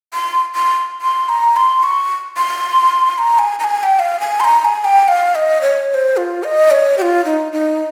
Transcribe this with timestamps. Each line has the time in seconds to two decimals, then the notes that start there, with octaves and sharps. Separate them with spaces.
0.14 C6
0.55 C6
1.02 C6
1.29 A#5
1.56 C6
1.83 C#6
2.37 C6
3.18 A#5
3.39 G#5
3.59 A#5
3.64 G#5
3.80 G#5
3.83 G5
3.99 F5
4.20 G#5
4.40 C6
4.44 A#5
4.61 A#5
4.65 G#5
4.81 G#5
4.85 G5
5.08 F5
5.35 D#5
5.62 C#5
5.90 C#5
5.94 C5
6.17 F4
6.44 D#5
6.71 C#5
6.98 G4
7.02 F4
7.25 D#4
7.52 D#4